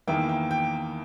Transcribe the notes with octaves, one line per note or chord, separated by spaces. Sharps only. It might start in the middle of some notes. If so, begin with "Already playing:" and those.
E2 D#3 A#3 E4 G5
G5
G5